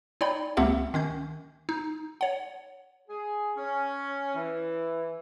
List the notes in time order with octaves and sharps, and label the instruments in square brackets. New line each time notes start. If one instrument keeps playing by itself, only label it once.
[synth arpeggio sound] D#4 C#5 D5 G5 B5
C#2 A#3 C4 G4 E5 F#5
D#3 C#4 G6
D#4
C#5 F#5
[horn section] G#4
C#4
E3